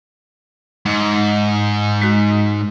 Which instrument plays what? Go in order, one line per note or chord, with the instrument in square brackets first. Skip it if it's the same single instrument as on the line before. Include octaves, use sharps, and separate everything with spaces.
[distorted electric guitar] G#2
[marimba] G#3 F#4